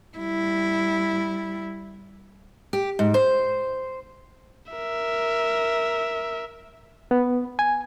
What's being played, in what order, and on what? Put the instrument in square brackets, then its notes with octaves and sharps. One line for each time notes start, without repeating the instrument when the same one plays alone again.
[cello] G3 E4
[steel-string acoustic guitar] G4
G#2
C5
[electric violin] A#4 E5
[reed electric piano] B3
G#5